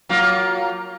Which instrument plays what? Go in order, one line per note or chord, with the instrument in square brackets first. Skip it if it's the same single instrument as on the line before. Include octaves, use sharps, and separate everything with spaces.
[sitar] F#3 A#3 F4